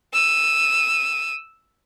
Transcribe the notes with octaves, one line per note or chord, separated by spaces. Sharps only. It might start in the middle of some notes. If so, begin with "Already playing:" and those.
E6 D#7